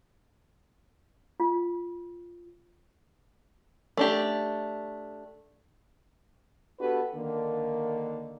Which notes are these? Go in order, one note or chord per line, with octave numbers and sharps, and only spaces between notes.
F4
A3 D4 G4
B3 D4 F#4 G4 A4 B4
D3 D#3 A#3